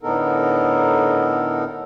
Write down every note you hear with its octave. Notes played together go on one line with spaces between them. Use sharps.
A2 D3 B3 D#4 A4 A#4